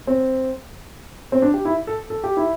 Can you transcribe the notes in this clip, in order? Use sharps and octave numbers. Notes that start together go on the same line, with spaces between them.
C4
C4
D4
G4
E4
A4
A4
G4
E4